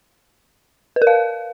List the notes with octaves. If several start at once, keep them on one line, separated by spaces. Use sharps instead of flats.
B4
A#4
F5